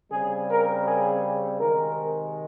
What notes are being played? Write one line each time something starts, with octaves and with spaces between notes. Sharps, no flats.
C#3 G3 C4 G#4
A#4
G#4
C3 D#3 G#3 A#4